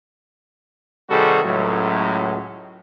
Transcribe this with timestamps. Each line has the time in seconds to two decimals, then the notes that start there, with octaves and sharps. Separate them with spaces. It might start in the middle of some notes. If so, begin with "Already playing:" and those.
1.10 C3 D#3 G3 F#4 G#4 A4
1.44 C#2 A2 F#3